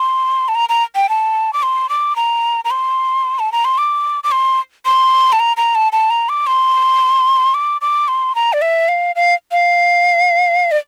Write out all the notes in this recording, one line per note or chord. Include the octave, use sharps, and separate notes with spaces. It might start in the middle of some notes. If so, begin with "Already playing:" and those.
Already playing: C6
A5
A#5
A#5
G5
A5
D6
C6
D6
A#5
A#5
C6
A5
A#5
C6
D6
D6
C6
C6
A5
A#5
A#5
A5
A5
A#5
D6
C6
D6
D6
C6
A#5
D5
E5
F5
F5
F5
D5